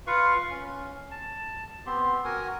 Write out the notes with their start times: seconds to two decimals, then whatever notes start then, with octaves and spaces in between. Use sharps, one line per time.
0.07 F4 B4 F5 C#6
0.50 C#4
1.11 A5
1.86 B3 C4 G4 C6
2.25 F#4 A#4 G#5